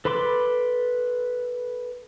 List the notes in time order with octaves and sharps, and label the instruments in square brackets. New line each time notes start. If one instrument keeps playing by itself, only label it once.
[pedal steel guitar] A4 B4 B5 C6 D6